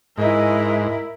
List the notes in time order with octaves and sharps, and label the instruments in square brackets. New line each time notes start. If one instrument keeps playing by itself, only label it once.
[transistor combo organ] G#2 [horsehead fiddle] E4 A#4 [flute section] D#5 G#5